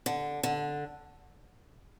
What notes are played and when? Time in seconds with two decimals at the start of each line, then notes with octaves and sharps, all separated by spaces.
0.06 D3
0.43 D3